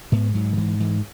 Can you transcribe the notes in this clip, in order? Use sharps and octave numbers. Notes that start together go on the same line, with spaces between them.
G#2 B3
G#2 F#3
D#3
G#2 E3
G#2 E3